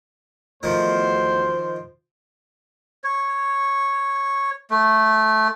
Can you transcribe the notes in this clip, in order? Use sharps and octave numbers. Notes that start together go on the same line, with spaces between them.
E2 D#3 F3 A3 F#4 C5
C#5
A3